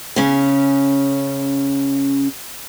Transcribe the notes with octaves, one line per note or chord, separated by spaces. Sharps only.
C#3 C#4